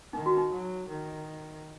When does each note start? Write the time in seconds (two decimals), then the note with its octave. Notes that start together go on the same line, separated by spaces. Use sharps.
0.13 D#3 D#4
0.26 F#4
0.37 D#4
0.52 F#3
0.88 D#3